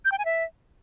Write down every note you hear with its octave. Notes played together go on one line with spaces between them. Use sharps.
G6
G5
G#5
E5